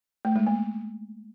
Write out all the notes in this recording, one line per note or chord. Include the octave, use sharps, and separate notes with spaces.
A3
G#3
A#3